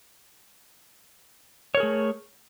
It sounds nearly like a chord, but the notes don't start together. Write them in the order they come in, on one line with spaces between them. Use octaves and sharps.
C#5 A#4 G#4 A3